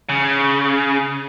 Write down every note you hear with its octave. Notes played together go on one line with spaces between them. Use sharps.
C#3